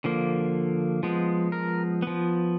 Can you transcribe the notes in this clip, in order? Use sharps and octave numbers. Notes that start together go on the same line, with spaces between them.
D3 F3 A#3
F3 G#3 B3
A#4
F3 B3